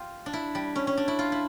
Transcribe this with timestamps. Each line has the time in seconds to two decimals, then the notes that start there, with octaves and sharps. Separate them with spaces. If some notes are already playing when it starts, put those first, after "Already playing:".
Already playing: F4 G4
0.26 D4
0.33 E4
0.55 G3
0.76 C#4
0.87 C#4
0.97 D4
1.08 E4
1.19 F4
1.32 E4